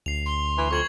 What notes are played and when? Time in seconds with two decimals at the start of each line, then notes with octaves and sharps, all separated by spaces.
0.06 D2 C7 F7
0.26 C6
0.58 E3
0.71 F2 C#6 G#6 F#7